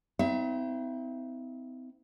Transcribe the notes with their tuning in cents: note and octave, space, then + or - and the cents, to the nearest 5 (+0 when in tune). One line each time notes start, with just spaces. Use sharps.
C4 -40 D#4 +45 E5 +35